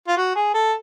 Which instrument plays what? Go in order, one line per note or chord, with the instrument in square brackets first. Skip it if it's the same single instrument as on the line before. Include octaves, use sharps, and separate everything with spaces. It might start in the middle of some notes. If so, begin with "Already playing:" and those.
[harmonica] F4
F#4
G#4
A4